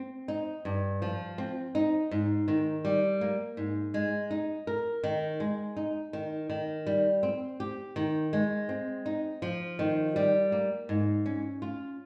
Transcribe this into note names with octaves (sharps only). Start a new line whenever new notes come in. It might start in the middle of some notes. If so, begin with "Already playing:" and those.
Already playing: C4
D#4
G2
F3
C4
D#4
G#2
D#3
G3
A#3
G#2
G#3
D#4
A#4
D#3
G#3
D#4
D#3
D#3
G3
C4
G4
D#3
G#3
C4
D#4
F3
D#3
G3
A#3
G#2
C#4
F4